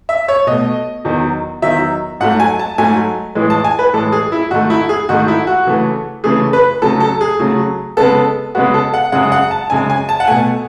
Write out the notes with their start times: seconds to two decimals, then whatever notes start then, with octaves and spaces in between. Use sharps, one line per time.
0.09 E5
0.28 C#5
0.47 B2 A3 D#5
1.05 E2 D#3 F#3
1.62 E2 D#3 F#3 E5
2.20 G#2 F#3 A3 F#5
2.40 G#5
2.59 A5
2.78 G#2 F#3 A3 G#5
3.35 A2 E3 G#3
3.50 A5
3.64 G#5
3.79 B4
3.93 A2 E3 G#3 A4
4.12 G#4
4.32 E4
4.51 G#2 D#3 A3 F#4
4.70 E4
4.89 G#4
5.09 G#2 D#3 A3 F#4
5.28 E4
5.47 F#4
5.67 C#3 E3 A3
6.24 C#3 E3 A3 G#4
6.53 B4
6.82 C#3 F#3 A3 A4
7.00 A4
7.21 G#4
7.39 C#3 F#3 A3
7.97 C#3 G#3 B3 A4
8.55 C#3 G#3 B3 F#4
8.74 A4
8.94 F#5
9.12 F#2 C#3 G#3 F#5
9.32 F#5
9.51 A5
9.70 F#2 C#3 G#3 G#5
9.90 G#5
10.09 A5
10.20 F#5
10.27 B2 A3 G#5